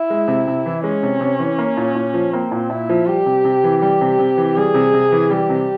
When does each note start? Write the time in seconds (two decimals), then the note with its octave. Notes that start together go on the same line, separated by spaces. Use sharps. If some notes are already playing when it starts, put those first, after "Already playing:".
Already playing: E4
0.10 G#3
0.28 C3
0.48 C3
0.66 E3
0.84 G#3 C#4
1.03 C3
1.21 C3
1.39 E3
1.58 A#3
1.77 A#2
1.95 A#2
2.14 F3
2.33 A#3 C4
2.52 A#2
2.70 A#2 E4
2.89 F3
3.07 G3 G4
3.26 C3
3.45 C3
3.64 E3
3.81 G3 G4
4.01 C3
4.19 C3
4.37 E3
4.56 G3 G#4
4.75 C3
4.93 C3
5.12 E3
5.31 G3 G4
5.49 C3